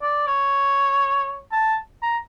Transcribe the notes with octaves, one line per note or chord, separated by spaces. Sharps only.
D5
C#5
A5
A#5